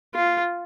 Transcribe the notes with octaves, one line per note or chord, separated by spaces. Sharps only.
F4